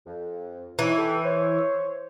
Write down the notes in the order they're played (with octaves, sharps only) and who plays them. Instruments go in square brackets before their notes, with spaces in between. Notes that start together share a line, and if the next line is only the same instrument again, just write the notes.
[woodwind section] F2
[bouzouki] E3 [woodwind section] D#4 C#5
[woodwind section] G4 A4
C5 C#5